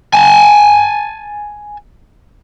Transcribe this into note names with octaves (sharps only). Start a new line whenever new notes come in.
G#5 A5